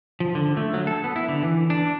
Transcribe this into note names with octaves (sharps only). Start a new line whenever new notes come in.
F3
D3
A3
F#3
A4
B3
E4
D3
E3
D4